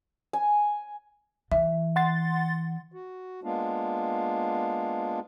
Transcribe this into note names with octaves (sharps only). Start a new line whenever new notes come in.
G#5
E3 E5
F#5 C6 A6
F#4
G#3 A#3 B3 D4 F4